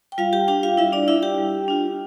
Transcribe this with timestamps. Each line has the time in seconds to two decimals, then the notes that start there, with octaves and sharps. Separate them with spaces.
0.12 G5
0.18 G3 F4 F5
0.33 G4 G5
0.48 D4 F4 G4 G5
0.63 F4 F5
0.77 G3 E4 E5
0.92 D4 D5
1.08 D4 E4 F4 E5
1.22 G4 G5
1.38 G3
1.68 D4 F4